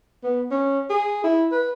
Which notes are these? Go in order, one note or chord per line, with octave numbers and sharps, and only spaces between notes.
B3
C#4
G#4
E4
B4